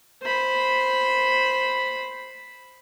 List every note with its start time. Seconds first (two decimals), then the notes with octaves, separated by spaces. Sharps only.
0.23 C5 B5